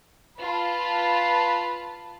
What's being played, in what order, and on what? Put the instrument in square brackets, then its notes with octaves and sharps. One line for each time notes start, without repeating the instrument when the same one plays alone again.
[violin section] F4 B4 A5